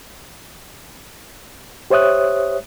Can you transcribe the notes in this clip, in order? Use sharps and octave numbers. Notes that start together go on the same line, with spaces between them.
G4 C5 C#5 E5 D#6 F#6